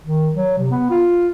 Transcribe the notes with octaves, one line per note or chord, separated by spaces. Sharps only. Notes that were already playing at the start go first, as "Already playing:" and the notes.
D#3
F#3
C3
B3
F4